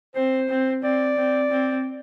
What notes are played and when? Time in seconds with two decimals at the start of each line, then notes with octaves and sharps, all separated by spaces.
0.15 C4 C5
0.49 C4
0.84 C4 D5
1.17 C4
1.51 C4